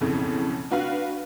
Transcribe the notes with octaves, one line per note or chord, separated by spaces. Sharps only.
B1 F2 A2 C#3
D4 F#4 B4 F5